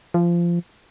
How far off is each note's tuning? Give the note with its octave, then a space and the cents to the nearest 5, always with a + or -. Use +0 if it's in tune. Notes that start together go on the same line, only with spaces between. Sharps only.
F3 -20